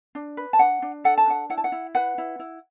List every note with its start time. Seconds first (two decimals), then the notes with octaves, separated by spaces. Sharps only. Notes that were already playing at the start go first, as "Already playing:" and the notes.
0.15 D4
0.37 B4
0.53 A5
0.59 D4 F#5
0.82 D4
1.04 A4 F#5
1.18 A5
1.27 D4 F#5
1.50 E4 F#5
1.58 A5
1.64 F#5
1.72 E4
1.95 B4 F#5
2.18 E4
2.39 E4